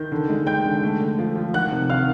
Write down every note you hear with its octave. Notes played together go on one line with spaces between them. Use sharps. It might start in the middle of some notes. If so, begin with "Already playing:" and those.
Already playing: D#3 G6
D3
G#3
G#3 G5 G6
D3
A3
D3
F3
F3
D#3 F#5 F#6
C3
D#3 F5 F6